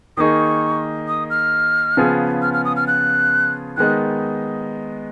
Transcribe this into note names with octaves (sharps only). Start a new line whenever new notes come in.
D#3 A#3 D#4 G#4 C#6 D#6
D#6
F6
C#3 F3 B3 F4 G#4
F6
F6
D#6
F6
F#6
D#3 G#3 B3 D#4 F#6